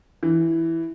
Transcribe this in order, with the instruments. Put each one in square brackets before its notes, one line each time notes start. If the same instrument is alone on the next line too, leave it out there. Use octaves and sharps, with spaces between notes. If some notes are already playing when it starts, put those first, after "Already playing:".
[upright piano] E3